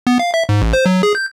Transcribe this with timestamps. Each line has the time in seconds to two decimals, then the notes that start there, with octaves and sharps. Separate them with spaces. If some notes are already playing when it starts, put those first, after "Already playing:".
0.07 B3
0.19 F5
0.34 E5
0.49 G#2
0.62 A1
0.73 C5
0.86 F#3
1.03 G#4
1.15 G6